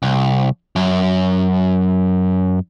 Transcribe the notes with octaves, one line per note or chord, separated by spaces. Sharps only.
C2
F#2